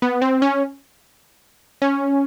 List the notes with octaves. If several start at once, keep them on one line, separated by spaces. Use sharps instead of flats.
B3
C4
C#4
C#4